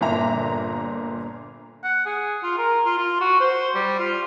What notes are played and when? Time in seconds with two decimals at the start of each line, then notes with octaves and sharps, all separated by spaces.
0.01 G1 A#2 E5 A#5 F7
1.84 F#5
2.06 G#4
2.43 F4
2.58 A#4
2.86 F4
2.98 F4
3.21 F#4
3.40 C5
3.75 G3
4.00 F4